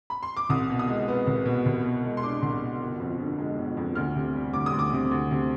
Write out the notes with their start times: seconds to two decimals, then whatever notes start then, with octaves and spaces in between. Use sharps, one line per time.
0.10 B5
0.23 C6
0.37 D6
0.49 C2 D#6
0.70 B2
0.79 D#6
0.88 G#3
1.08 B3
1.27 C2
1.46 B2
1.66 C2
1.84 B2
2.04 G#3
2.17 C6
2.23 D4 D6
2.42 C2
2.61 B2
2.81 G1
3.00 F2
3.19 D3
3.38 G#3
3.58 G1
3.77 F2
3.95 D2 F6
4.16 C3
4.35 G3
4.53 D2 D6
4.66 D#6
4.73 D2
4.79 D6
4.93 C3
5.11 D2
5.31 C3